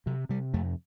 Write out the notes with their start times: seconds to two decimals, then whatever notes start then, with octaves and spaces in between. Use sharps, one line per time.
0.06 C3 F#3
0.29 C3 G3
0.54 F2 A3